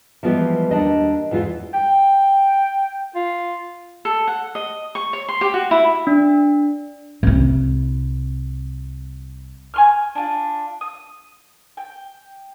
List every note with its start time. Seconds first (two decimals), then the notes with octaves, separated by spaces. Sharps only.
0.23 E3 F3 G3 G#3 B3 G4
0.71 D#2 G3 D4 D#5
1.31 E2 E3 G#3 F4
1.74 G5
3.15 F4
4.05 A4
4.27 F#5
4.55 D#5
4.95 C#6
5.13 C#5
5.29 C6
5.41 G4
5.54 F#4
5.71 E4
6.07 D4
7.23 C2 E4
9.74 G#5 C6 F6
10.15 D4 F4
10.81 D#6
11.77 G5